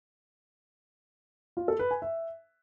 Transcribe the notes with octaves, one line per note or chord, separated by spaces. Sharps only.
F4
A4
B4
G#5
E5